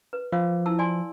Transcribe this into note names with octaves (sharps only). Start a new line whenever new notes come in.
B4
F3 F5
E4 A5 E6
D5 G#5 C6